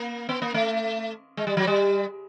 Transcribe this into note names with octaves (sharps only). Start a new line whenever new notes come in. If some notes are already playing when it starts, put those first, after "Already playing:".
Already playing: A#3
B3
A#3
A3
G#3
G3
F#3
G3